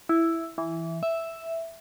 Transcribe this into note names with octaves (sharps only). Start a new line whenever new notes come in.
E4
E3
E5